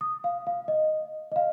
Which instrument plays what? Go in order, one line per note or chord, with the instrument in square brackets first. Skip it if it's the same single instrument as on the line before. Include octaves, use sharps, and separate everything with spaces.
[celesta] D#6
F5
F5
D#5
D#5
F5